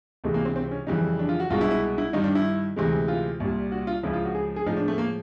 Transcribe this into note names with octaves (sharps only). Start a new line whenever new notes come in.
C#2 C3 E3 G#3 A3
A#3
C4
C4
C#4
F2 C#3 E3 G3 D#4
D4
F4
F#4
C2 B2 G#3 F4
E4
E4
E4
G2 D#3 G3 D#4
D4
E4
D2 C3 E3 G#3
F4
C2 A#2 G3
F#4
F4
C#2 C#3 F3 E4
F4
F#4
G#4
G#4
A2 F3 G#3 D#4
D4
A3
A#3